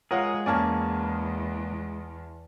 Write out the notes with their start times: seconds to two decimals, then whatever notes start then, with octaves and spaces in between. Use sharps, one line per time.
0.11 G#3 F4 G#4 A#4 C#5 F5 F#5
0.46 E2 A#3 C#4 D5 G#5 A5